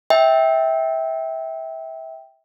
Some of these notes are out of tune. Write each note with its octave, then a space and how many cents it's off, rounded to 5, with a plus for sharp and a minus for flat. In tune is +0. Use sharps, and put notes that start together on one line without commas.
E5 -20 G5 +0